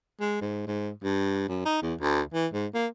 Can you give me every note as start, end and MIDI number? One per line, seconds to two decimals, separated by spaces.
0.21 0.37 56
0.41 0.65 44
0.67 0.91 44
1.03 1.45 43
1.49 1.64 42
1.66 1.78 63
1.82 1.95 40
2.01 2.21 38
2.34 2.47 52
2.53 2.67 44
2.74 2.87 58